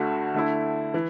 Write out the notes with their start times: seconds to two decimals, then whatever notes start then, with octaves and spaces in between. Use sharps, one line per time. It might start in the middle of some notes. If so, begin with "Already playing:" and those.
Already playing: D2 D3 A3 F#4
0.34 D3 A3 E4
0.94 E3